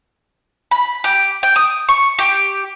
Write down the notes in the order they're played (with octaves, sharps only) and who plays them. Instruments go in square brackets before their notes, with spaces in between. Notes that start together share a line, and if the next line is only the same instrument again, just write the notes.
[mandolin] B5
G4
G5
D#6
C#6
G4